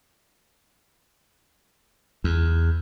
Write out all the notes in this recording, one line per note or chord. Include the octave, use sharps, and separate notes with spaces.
E2